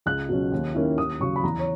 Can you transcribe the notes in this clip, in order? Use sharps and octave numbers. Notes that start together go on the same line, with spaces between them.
C#2 F#6
B2 F#3 C#4
D#2
D#3 A#3 C#4 E4
D#2 D#6
C#3 F#3 C#6
B5
E2 A#5
C#5